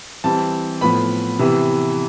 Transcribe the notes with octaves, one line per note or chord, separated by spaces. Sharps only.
E3 G3 C4 A5
A2 F3 B3 B5
C3 E3 B3